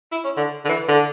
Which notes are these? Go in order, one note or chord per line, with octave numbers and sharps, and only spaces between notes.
E4
C#4
D3
D3
E3
D3